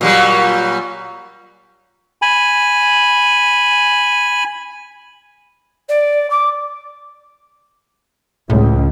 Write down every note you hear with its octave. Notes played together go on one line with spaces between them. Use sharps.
A#2 F#3 G3
G#5 B5
D5
D6
C#2 A2